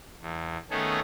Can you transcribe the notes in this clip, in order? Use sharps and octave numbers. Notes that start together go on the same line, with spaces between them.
E2
D#3 A3 B3 C#4 G#4 A4